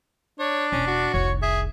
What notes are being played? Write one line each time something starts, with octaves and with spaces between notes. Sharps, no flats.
D4 C#5
E1 C#4
F#4
F1 C2 C#5
G#4 E5